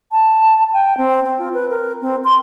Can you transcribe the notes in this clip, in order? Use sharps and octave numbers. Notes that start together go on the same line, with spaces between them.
A5
G5
C4
C4
F4
B4
A#4
C4
C6